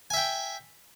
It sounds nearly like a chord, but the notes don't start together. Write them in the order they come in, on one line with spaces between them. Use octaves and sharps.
G#5 E5 G5